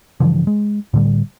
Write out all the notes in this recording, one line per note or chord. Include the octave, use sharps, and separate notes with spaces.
G2 C#3 E3 F3
G#3
A2 D3 G3